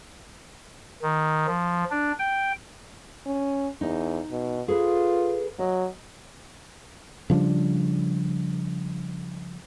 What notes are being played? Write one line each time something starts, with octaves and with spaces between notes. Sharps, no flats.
D#3
F3
D4
G5
C#4
E2 D#4
B2
F4 G#4 A4 B4
F#3 D#5
C#3 F3 G3 D4